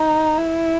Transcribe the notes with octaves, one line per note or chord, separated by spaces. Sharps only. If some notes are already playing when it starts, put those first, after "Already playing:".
Already playing: D#4
E4